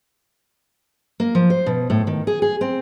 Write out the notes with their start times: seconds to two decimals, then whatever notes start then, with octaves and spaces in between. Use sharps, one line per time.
1.20 A#3
1.35 F3
1.50 C5
1.66 B2
1.90 A2
2.07 D#3
2.27 G#4
2.42 G#4
2.61 C4